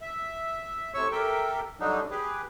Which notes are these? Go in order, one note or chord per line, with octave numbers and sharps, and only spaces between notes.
E5
A2 C3 C#5 C#6 E6
G4 A4 A#4 E5 G5
F#2 D3 F#3 G3 D4 D#4
G4 G#4 B4